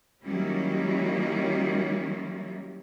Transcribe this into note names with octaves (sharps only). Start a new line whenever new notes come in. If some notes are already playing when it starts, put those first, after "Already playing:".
D#3 F#3 G3 A#3 C#4 E4